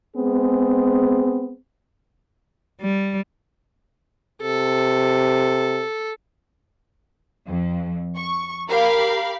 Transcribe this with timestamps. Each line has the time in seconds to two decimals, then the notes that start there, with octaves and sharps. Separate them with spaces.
0.17 G#3 B3 C4 G#4
2.81 G3
4.42 C3 A4
7.47 F2
8.16 C#6
8.67 G4 A#4 F5 B5